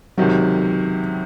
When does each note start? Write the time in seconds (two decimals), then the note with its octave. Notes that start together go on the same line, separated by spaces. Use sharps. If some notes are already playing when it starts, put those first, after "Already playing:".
0.17 C#2 C3 D#3 F#3